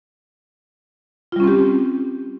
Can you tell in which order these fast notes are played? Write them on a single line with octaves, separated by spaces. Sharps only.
F4 G3 C#4 C4 G4